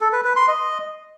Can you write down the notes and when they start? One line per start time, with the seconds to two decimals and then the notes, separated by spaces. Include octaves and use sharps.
0.01 A4
0.13 B4
0.24 B4
0.36 C6
0.48 D#5